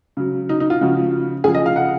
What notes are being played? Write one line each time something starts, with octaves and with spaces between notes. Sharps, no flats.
C#3 F#3
D#4
D#4
F4
C#3 F3 F#4
C#3 F3 G#4
D#5
F5
F#5